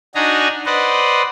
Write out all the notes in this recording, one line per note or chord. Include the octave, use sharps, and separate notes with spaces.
D4 D#4 F#4 G#5 A#5
B4 C5 D5 D#5 F#5